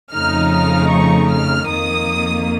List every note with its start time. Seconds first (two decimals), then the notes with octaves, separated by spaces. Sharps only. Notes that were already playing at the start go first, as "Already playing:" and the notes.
0.13 F2 C#3 F3 A3 D#4 F6
0.51 F6
0.90 C#6
1.30 F6
1.68 F2 D#3 A#3 D#6